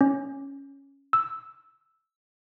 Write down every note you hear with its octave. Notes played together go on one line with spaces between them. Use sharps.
C#4
E6